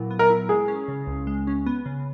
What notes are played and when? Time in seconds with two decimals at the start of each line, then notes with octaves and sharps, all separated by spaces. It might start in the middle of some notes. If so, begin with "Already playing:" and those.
Already playing: A#2 F#3 B3 E4
0.11 B3
0.19 A#4
0.30 E4
0.49 G#3 G#4
0.68 C#4
0.88 C#3
1.07 C#2
1.27 G#3
1.47 C#4
1.66 B3
1.86 C#3